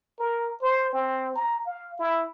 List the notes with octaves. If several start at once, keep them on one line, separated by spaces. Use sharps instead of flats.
A#4
C5
C4
A#5
F5
E4